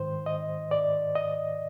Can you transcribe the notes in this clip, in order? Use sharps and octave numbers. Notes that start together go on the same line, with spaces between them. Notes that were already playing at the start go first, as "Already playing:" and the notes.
Already playing: G#2 D#3 C5
D#5
D5
D#5